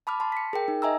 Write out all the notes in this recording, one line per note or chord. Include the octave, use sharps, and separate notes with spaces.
A5 B5 D6 F6
A5 C6
B6 C#7
G#4 A#4 G5
D#4
D#5 E5 G#5 A#5 E6